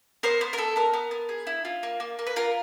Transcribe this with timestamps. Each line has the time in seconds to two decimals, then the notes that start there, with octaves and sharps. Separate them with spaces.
0.23 B3 A#4 C5
0.41 B3
0.53 A#4
0.58 B3 A4
0.76 B3 A#4
0.93 B3
1.11 B3
1.29 G#4
1.47 E4
1.65 F4
1.83 A#3
2.00 A#3
2.19 A#3
2.27 B4
2.36 F4 A#4